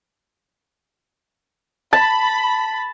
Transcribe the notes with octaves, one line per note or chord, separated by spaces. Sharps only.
A5 B5